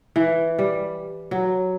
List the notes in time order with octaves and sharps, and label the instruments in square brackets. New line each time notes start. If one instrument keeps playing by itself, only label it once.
[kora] E3
G3
F#3